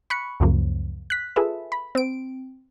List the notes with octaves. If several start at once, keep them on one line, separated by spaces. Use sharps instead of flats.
B5 C#6 F#6 C#7
C#2 F#2 C#3 F3 A#3
F#6 B6
F4 G#4 A4 B4 E5
B5
C4 D7